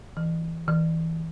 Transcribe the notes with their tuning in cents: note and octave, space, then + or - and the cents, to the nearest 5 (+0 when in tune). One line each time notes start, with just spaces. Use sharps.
E3 -5
E3 -20